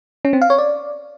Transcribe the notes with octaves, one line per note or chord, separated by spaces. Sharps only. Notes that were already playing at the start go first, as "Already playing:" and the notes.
C#4
C4
F5
C#5
D5